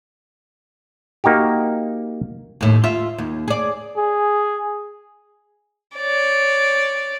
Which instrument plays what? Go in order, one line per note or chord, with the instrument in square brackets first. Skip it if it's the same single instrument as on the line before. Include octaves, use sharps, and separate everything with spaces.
[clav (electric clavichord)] A#3 D#4 F#4 G4
[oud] D#2 A2
F4 E5
D#2
G#4 D5
[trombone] G#4
[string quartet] C#5 D5